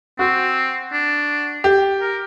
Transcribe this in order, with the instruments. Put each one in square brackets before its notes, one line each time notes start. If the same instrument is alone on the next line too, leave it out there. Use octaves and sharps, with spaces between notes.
[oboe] C4 [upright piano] F#4
[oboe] D4
[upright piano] G4
[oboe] A#4